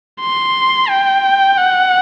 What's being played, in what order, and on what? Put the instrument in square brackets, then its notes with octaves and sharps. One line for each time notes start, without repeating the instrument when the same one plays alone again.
[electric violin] C6
G5
F#5